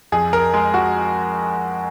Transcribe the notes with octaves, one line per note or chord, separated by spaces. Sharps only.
F2 G#4
A#4
G#3 G#4
F#4